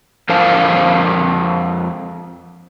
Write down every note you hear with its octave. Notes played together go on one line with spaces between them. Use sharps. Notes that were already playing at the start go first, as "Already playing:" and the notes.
F2 A#4 C5 F5 A5